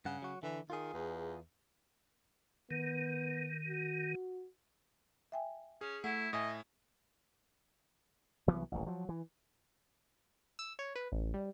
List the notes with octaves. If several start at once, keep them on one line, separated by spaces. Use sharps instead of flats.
G2 C#3 F#5
F#3 F#4
D3 E3
D#3 F4 G#4
E2
D#3 B3
F#4
E5 G5 G#5
C#4 G#4
A3 E4 F#5
A2 D#5 E5 G#5
C2 E3 F#3 B3
D#1 A1
F3 F#3
E3
E6
C#5
B4
A1
G3